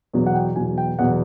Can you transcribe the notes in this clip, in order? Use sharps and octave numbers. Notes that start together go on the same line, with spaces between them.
E2 B2 F#3
F#5
G5
E2 B2 F#3 G#5
G5
E2 B2 F#3 F#5